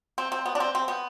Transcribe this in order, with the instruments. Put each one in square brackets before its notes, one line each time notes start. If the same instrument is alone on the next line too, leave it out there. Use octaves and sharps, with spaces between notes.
[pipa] C4
C4
B3
D4
C4
C4
B3